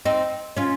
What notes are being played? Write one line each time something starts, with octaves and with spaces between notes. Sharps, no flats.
C4 D#4
C#4 F4